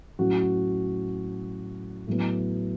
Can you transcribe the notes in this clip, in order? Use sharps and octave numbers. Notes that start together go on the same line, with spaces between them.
A2 F#3 C#4 F#4
A2 F#3 B3